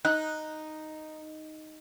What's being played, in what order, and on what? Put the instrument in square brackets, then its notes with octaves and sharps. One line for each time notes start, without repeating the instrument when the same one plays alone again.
[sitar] D#4 [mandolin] F#6